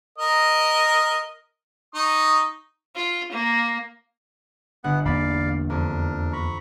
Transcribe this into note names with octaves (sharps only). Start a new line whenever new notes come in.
A#4 D#5
D#4 C#6 D#6
F4
A#3
G1 B3 F#5
E2 A#3 D5 F5 B5 A6
F2 D4 A#4
A#5 B5 C#6